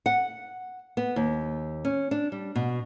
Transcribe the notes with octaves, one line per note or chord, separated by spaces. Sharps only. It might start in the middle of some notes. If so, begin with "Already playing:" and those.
F#5
B3
D#2
C#4
D4
G3
B2